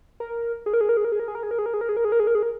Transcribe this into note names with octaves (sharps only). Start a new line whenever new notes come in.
A#4
G#4
A#4
G#4
A#4
G#4
A#4
G#4
A#4
G#4
A#4
G#4
A#4
G#4
A#4
G#4
A#4
G#4
A#4
G#4
A#4
G#4
A#4
G#4
A#4